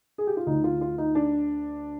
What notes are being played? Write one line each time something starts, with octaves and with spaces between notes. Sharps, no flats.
G#4
G4
F4
D2 D3 D#4
F4
F4
D#4
D4